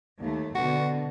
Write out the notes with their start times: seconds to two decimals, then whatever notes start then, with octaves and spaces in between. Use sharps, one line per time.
0.20 D#2 A3
0.55 B2 D3 F#4